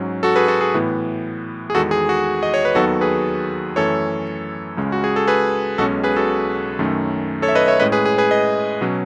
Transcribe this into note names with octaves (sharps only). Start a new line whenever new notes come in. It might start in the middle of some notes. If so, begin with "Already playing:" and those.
Already playing: G#2 F#3 C#4
F#4 A4
G#4 B4
F#4 A4
G#4
A2 E3 B3
G#4
E2 D#3 G#3 F#4 A4
G#4
F#4
D#5
C#5
B4
D#2 D#3 F#3 B3 F#4 A4
G#4 B4
F#2 E3 A3 C#4 A4 C#5
C#2 C#3 G#3 C#4
F#4
G#4
A4
G#4 B4
B1 B2 G#3 C#4 F#4 A4
G#4 B4
F#4 A4
F#2 D#3 A3 C#4
A4 C#5
E5
B4 D#5
C#5 E5
A2 G#3 C#4 B4 D#5
G#4 B4
G#4
G#4 B4
B4 D#5
B2 F#3 C#4